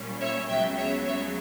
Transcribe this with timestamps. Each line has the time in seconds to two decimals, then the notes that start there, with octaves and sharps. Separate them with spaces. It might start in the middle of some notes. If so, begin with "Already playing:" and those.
Already playing: A#2 G3 C#4
0.21 C#5 E5
0.49 C#2 C#3 F#3 B3 E5 G5
0.77 C#5 E5
1.06 C#5 E5